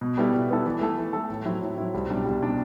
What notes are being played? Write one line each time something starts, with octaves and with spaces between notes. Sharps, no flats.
B2
G3 B3 E4 A4
B2
G3 B3 E4 A4
E3
A3 E4 A4
E3
A3 E4 A4
A2
F#3 C4 E4
A2
F#3 C4 E4
C2
B2 G3 D4
C2
B2 G3 D4